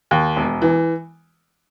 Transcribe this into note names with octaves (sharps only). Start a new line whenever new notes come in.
D#2
E1
E3